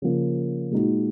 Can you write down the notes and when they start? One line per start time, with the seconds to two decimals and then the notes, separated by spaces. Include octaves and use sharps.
0.02 C#3 F3 A#3
0.71 A#2 G#3 D#4 F#4